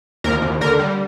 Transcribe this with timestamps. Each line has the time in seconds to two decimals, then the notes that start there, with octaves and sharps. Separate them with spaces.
0.24 D#2 A#4
0.42 D#2
0.61 D3 A#4
0.79 G3